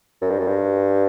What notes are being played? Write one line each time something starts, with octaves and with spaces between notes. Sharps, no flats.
F#2
G2
F#2
G2